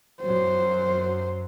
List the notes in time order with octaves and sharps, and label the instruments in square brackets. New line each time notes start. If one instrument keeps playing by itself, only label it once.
[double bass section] F#2 F#3 [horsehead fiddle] C5